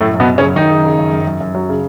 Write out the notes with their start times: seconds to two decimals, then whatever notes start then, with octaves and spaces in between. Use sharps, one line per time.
0.01 F#2 A2 A3
0.14 F#2
0.20 B2 B3
0.29 F#2
0.38 C#3 C#4
0.43 F#2
0.56 F#2 D#3 D#4
0.70 C#3
0.85 C#3
0.99 F#2
1.13 F#2
1.27 F#2
1.41 F#2
1.55 F#3
1.69 C#3